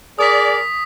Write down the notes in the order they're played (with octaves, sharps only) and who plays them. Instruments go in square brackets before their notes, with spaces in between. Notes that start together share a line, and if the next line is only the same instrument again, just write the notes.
[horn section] G#4 A#4 D5 [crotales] D#6 B6